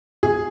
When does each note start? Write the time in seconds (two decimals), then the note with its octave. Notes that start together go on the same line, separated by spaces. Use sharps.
0.23 G#4